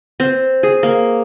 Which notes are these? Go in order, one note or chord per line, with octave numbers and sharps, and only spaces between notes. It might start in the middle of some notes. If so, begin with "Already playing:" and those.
C4
G#4
A#3